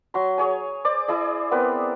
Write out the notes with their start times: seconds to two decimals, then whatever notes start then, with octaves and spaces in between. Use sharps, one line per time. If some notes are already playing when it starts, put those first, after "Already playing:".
0.14 F#3 C6
0.38 G#4 C#5 G#5
0.85 C5 D5 D6
1.08 E4 G#4 D5
1.51 B3 C4 A#4 B4